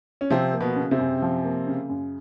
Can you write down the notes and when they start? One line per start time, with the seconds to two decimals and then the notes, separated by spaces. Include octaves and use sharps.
0.21 C#4
0.30 C3 F3 C4
0.53 A#3
0.61 B2 B3
0.76 C#3
0.91 C3 C4
0.99 F#2
1.22 F3
1.44 A#3
1.67 C#3
1.89 F#2